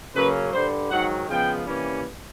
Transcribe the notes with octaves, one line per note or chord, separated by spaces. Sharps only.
C#3 F#3 A#3 C#4 B4
G2 D3 G3 C5
G#2 D#3 F#3 F#5
C#3 F3 G#3 B3 G5
C3 E3 G3 A#3 C#4